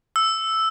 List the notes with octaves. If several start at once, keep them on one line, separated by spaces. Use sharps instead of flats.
E6